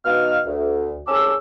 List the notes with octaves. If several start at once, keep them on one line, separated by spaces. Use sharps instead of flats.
B2 D#4 F5 F6
D2
C2 C#4 G#4 A5 D6 E6